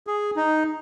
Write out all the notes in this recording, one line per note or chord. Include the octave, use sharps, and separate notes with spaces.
G#4
D#4